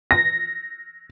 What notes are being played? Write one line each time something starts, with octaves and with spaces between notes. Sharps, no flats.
A#6